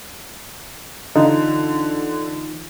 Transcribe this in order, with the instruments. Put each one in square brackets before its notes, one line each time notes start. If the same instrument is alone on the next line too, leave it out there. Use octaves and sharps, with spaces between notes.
[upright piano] D3 [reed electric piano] E3 D#4 F4